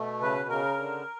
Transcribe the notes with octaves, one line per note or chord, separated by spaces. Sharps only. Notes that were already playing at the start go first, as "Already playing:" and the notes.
Already playing: B2 A3
C#3 B4
C#3 A#4
D3